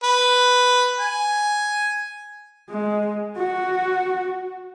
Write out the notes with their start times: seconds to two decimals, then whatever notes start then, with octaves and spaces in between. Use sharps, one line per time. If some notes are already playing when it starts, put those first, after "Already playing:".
0.03 B4
1.00 G#5
2.70 G#3
3.37 F#4